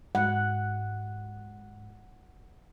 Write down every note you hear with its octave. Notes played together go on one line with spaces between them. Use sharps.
G#2 F#5